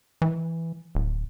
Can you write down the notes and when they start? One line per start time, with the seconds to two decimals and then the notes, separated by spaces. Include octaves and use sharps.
0.22 E3
0.95 D1